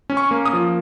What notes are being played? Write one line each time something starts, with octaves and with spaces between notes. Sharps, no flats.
C#4
C#6
A#3
D#6
F3